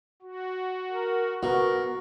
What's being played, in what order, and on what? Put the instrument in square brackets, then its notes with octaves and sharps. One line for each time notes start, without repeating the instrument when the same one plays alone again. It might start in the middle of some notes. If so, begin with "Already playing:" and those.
[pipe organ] F#4
[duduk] A#4
[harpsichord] B2 [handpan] F#4 [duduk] A#4